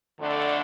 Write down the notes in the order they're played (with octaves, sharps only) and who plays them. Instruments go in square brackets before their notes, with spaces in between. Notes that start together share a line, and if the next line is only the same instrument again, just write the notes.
[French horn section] F2 D3 A3 D4